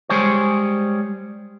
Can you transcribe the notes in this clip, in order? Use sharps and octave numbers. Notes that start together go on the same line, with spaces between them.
G3 G#3 G#4 C5 C#5